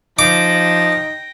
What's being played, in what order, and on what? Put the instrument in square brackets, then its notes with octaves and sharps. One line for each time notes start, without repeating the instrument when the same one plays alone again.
[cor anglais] F3 [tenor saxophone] D#4 [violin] G5 A#6 [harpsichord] D6